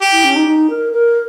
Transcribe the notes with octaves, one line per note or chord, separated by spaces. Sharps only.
G4
E4
C#4
D#4
D#4
A#4
A#4